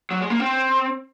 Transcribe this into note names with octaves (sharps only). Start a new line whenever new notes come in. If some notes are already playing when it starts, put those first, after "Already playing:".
F#3
G#3
A#3
C4